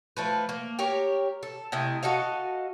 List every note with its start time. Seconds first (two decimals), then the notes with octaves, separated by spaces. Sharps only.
0.17 F3 A3 B4
0.49 A#3
0.79 G4 A#4 C#5
1.43 A4
1.72 C3 A3 E4 D#5
2.03 F#4 A4 D#5 F5